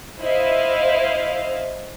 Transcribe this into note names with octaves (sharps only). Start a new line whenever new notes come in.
E4 C5 D#5 F5